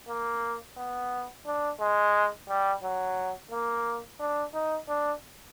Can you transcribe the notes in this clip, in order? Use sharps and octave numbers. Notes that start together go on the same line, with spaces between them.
A#3
B3
D4
G#3
G3
F#3
A#3
D4
D#4
D4